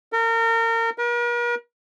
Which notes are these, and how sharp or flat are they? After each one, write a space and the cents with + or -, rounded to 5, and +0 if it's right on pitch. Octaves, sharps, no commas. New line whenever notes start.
A#4 -30
A#4 +45